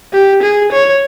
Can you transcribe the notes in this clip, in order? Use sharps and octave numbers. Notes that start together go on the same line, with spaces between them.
G4
G#4
C#5